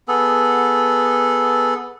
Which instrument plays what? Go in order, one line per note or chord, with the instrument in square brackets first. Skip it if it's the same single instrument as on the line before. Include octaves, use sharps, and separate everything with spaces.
[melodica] B3 G#4 A4